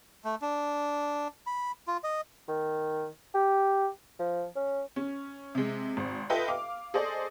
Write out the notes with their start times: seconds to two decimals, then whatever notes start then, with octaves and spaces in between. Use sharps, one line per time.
0.24 A3
0.42 D4
1.47 B5
1.88 F4
2.04 D#5
2.48 D#3
3.35 G4
4.19 F3
4.56 C#4
4.96 C#4
5.55 C3 G#3
5.97 G#1 C4
6.30 F4 A4 B4 D#5 E5 G5
6.48 F5 D6
6.94 G#4 A4 C5 D5 D#5